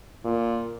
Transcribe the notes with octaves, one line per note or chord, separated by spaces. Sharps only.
A#2